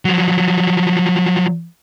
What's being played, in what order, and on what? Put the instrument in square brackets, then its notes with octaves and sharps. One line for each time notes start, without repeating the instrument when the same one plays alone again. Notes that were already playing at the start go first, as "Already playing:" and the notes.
[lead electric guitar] F3 F#3